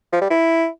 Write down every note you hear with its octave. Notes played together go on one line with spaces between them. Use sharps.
F3
G3
E4